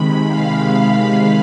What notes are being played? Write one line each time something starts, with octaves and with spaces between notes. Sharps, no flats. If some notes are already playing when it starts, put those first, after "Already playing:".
Already playing: C3 D#3 G#3 B5
F5